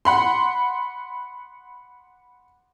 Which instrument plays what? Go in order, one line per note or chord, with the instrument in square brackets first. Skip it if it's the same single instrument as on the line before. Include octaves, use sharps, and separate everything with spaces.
[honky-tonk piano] F#5 B5 C6